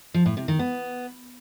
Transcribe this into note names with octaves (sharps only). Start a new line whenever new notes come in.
F3
A2
C3
D#3
B3